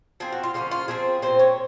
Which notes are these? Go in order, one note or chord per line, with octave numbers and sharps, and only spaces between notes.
F3 C4 G#4
F#4
F4
C#3 F3 A#3 C#4 F4
F4
F3 C4 G#4
A#2 G#3 C4 C5
C#5